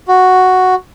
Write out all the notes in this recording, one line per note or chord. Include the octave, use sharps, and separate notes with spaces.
F#4